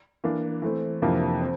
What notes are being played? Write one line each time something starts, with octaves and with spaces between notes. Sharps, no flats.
E3 A#3 D4
E3 A3 C4
F2 C3 E3 A#3 D4
C4